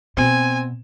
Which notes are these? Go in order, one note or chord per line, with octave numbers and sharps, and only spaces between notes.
B2 C4 G#5